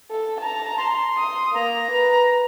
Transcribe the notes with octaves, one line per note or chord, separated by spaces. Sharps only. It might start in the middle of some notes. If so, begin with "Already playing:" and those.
A4
A5 A#5
C6
D#6
A#3 A#5
B4